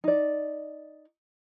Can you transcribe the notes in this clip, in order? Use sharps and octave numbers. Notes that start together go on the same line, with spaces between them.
D#4 D5